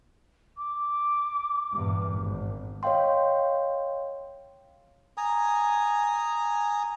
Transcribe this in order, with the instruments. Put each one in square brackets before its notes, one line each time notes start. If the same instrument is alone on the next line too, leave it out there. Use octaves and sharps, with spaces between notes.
[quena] D6
[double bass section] E2 G2 A#2
G#1
[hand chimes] C#5 D#5 F5 G5 C6
[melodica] G#5 A#5 D#6